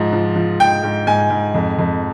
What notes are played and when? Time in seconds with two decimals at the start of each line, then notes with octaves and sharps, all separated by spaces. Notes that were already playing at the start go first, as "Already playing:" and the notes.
Already playing: G#2 F3
0.12 F3
0.36 F3
0.60 G#2 G5
0.83 G#2
1.07 G#2 G#5
1.30 G#2
1.54 F2
1.79 F2